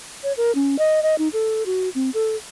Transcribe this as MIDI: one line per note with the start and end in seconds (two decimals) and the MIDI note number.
0.24 0.32 73
0.37 0.52 70
0.55 0.76 61
0.79 1.02 75
1.03 1.15 75
1.18 1.28 63
1.33 1.65 69
1.66 1.89 66
1.95 2.10 60
2.14 2.36 69